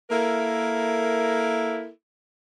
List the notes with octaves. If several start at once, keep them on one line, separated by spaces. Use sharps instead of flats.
A#3 E4 A4 A#4